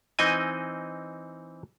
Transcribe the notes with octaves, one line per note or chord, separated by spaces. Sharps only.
E3 C4 D#4 D#5 G#5